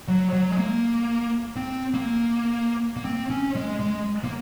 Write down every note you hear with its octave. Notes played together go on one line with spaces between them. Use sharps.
F#3
F#3
G#3
A#3
C4
A#3
A#3
C4
C#4
G#3
G#3
A#3